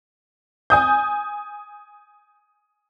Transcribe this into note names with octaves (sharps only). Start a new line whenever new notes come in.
G#5 D#6 G6